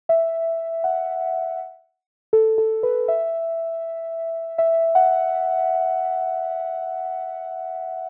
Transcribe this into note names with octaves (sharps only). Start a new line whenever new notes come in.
E5
F#5
A4
A4
B4
E5
E5
F#5